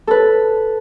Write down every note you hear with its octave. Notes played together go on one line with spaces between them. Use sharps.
A4 B4